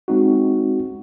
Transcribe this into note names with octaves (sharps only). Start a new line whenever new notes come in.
G#3 C4 D#4 F#4